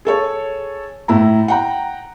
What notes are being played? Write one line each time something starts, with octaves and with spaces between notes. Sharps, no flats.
G#4 A4 C#5
A2 E4 A#5
F#5 G5 A#5